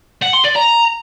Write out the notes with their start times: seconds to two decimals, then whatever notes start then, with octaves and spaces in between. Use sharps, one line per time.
0.22 F#5
0.34 C6
0.45 D5
0.56 A#5